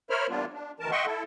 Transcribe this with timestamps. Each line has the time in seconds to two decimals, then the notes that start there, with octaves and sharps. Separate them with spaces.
0.10 A#4 C5 C#5 E5 B5 F6
0.30 E3 G3 A#3 B3 D4 F4
0.54 D4
0.80 D2 D#3 E3 A#4 A5
0.91 D#5 E5 F#5 G5 C6 C#6
1.06 E4 A4